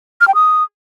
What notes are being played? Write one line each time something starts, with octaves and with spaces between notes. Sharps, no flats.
F6
G5
D#6